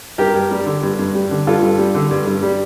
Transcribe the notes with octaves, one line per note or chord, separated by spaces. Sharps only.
G2 G4 A#4
G2
G3
D3
G2
G2
G3
D3
G2 F4 A4
G2
G3
D3
G2
G2
G3